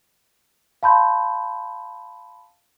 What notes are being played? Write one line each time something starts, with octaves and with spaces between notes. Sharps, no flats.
F5 A5 B5 C6 G6